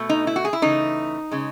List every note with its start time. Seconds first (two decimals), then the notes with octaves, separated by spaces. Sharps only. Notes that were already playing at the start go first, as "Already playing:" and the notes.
Already playing: B2 A3
0.09 D#4
0.27 E4
0.36 F#4
0.45 G#4
0.53 E4
0.62 C#3 E3 A3 D#4
1.31 C#3 G#3